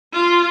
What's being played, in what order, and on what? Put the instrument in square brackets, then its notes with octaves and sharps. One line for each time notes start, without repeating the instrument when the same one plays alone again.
[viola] F4